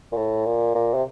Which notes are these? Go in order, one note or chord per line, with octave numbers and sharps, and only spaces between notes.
A#2
A2
A#2
A#2
C3